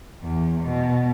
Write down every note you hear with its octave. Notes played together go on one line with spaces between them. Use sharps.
E2
B2